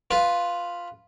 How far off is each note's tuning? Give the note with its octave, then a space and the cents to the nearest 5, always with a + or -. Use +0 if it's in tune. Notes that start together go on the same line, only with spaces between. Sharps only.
F4 +0 B4 +0